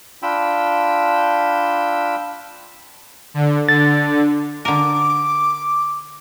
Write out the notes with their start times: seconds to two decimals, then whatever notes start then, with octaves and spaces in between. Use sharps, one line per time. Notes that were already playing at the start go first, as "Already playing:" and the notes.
0.23 D4 F4 G5 B5 E6
3.34 D3
3.69 D3 A6
4.65 D3 A#4 D6